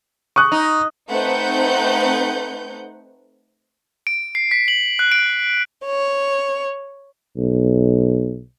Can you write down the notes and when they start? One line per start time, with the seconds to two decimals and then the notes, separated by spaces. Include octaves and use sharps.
0.36 C#6 D#6 F#6
0.52 D#4
1.09 A3 C4 D#4 B4 F#5 G6
4.07 D7
4.35 C7
4.51 B6
4.68 F#7
4.99 F#6
5.12 D7
5.86 C#5
7.37 B1